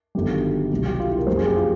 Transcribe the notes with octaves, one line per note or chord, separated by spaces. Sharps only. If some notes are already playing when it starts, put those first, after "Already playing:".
G1 G2 D#3 F#3 G4
C2 B2 F#3
G4
F4
E4
A#4
F#1 F2 C#3 F#3 C5
G#4
G4
F4